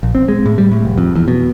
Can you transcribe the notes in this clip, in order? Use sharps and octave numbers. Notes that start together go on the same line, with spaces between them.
A#1
C4
G#3
A2
G3
A2
F1
F2
E2
B2